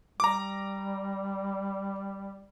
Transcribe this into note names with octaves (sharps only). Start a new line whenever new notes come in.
G3 A#5 D6